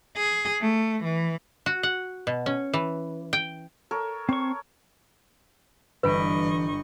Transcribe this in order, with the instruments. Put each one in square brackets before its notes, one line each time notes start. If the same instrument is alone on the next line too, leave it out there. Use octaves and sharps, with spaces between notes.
[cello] G#4
A3
E3
[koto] F#4
F#5
B2
C#4
E3
G5
[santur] A4 A#4 C#5
[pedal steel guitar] C4 C#6 [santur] C#5
[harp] G1 B5 D7 [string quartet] G2 D#5 C#6 [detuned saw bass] E3 [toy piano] B4